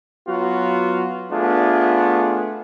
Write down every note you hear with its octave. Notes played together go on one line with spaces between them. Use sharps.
F#3 B3 F4 F#4
A3 B3 D4 F4 G#4